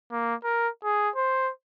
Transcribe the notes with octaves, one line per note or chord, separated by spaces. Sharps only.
A#3
A#4
G#4
C5